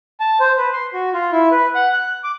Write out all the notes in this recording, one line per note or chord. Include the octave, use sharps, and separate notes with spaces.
A5
C5
B4
C6
F#4
F4
E4
B4
F#5
F#6
D6